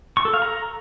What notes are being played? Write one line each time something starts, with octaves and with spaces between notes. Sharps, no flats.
C#6
A4
F5
A#5